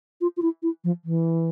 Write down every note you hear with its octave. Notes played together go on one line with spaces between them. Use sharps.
F4
F4
E4
E4
F3
E3